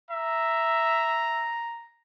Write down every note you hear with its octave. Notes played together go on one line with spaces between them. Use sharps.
E5 A#5